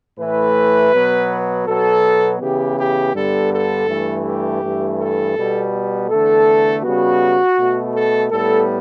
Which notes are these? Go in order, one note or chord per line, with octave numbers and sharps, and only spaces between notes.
A2 E3 A3 B4
B2 F#3 B3
B2 F#3 B3 A4
C#3 E3 B3 G4
G4
G2 D3 G3 B3 A4
A4
G2 E3 A3
G4
G2 E3 A3
A4
B2 G3 B3
E2 D3 A3 A4
C#3 G3 B3 F#4
B2 A3
A4
A2 G3 B3 A4